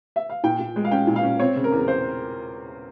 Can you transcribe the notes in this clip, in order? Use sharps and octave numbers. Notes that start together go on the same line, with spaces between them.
E5
F5
A#2 G5
A#2
G#3
F5
C#4 G5
A#2
F5
C#4
C4 C#5
C#3
A#4
E2
C5